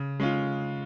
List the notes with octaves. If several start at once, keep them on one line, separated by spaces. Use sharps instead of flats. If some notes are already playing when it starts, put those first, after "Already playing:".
Already playing: C#3
G#3 C#4 F4